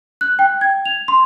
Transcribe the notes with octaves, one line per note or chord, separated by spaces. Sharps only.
F#6
G5
G#6
F7
C6